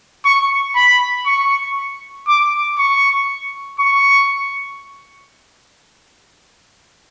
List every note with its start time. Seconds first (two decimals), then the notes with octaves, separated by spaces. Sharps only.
0.25 C#6
0.75 B5
1.26 C#6
2.27 D6
2.78 C#6
3.80 C#6